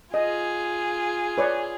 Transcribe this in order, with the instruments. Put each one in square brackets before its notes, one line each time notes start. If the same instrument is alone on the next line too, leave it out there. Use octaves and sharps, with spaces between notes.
[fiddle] F4 G#4 [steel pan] D#5
[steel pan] B4 C#5 D5